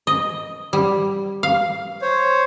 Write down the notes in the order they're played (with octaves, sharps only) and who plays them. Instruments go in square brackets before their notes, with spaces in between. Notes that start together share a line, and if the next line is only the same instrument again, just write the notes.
[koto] D#5
G3
F5
[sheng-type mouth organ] C5 C#5